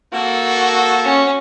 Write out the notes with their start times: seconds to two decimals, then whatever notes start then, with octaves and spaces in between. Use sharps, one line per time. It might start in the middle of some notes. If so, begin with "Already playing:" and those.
0.13 A#3 F#4 A4
1.04 C#4